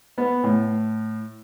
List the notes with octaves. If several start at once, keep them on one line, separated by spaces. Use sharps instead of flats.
B3
A2